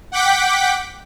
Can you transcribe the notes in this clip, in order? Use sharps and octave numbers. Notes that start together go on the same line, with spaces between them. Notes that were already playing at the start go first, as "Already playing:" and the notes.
F#5 G5 D6 B6